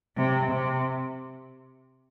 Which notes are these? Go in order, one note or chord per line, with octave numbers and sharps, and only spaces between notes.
C3
C3